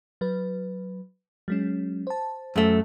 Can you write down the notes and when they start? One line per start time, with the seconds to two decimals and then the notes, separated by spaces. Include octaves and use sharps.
0.21 F#3 B4
1.48 F#3 G#3 C#4
2.07 C5 A5
2.56 F#2 A3